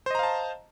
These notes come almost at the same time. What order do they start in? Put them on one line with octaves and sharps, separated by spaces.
C5 D#5 A#5 F5 A5